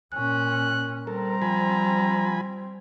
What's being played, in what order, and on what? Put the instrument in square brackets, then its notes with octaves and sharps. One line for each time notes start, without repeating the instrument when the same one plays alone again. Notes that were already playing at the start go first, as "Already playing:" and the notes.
[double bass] A#2 C#4 [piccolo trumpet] F#6
[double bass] G3 C4 [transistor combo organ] A4 A#4 [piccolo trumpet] A#5
[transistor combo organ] F3 G#5 B5